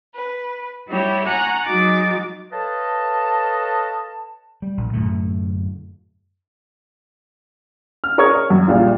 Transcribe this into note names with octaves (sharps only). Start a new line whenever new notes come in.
B4
G3 E4 F#4 G4 C#5
F#5 G#5 A#5 C#6 F#6
F#3 G#3 D#4 F#4 D6 A6
A4 B4 C#5 D#5 F5 A5
G3
A#1 A#2
F#2 A2 D3 A3
F6
G#4 A#4 C#5 C#6 D#6 G#6
C#5
F#2
A#1 A#2 G3 F4